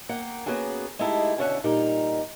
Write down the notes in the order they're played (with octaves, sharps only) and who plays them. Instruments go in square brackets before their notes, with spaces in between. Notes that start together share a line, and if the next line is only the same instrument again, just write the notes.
[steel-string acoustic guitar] A#3 F#5 G5
A#3 B3 C#4 F#4 G#4
G#3 A3 D#4 E4 G4 A4
B2 D3 C#4 E5 F#5
A#2 G3 D#4 A#4